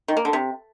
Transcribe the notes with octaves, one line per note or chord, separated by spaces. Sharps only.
D#3
A#3
D3
C3